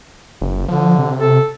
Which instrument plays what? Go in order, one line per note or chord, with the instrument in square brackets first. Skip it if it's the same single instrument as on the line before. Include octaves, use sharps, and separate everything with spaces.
[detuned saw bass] F#1
[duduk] D3 [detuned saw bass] F3
[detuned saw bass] C3
[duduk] A4